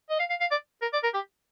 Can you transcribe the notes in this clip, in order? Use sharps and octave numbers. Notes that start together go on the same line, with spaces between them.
D#5
F5
F5
F5
D5
A#4
D5
A#4
G4